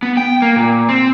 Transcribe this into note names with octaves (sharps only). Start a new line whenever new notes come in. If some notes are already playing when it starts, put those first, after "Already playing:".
B3
G5
A#3
A#2
C4